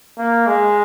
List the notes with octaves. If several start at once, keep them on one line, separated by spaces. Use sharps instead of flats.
A#3
G#3